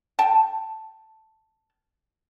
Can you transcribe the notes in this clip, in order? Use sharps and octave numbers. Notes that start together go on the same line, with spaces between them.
G5 A5